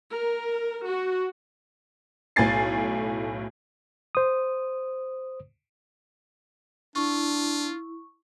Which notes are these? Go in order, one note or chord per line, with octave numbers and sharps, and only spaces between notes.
A#4
F#4
B1 A2 G#5 A6 C7
C5 D#6
D4 E4 F4 C#6